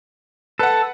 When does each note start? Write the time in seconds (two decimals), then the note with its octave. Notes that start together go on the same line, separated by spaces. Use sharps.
0.59 A4 B4 F#5